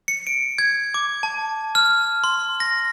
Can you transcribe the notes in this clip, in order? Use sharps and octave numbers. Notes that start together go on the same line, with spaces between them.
C#7
D7
G#6
D6
A5
F6
C6
A#6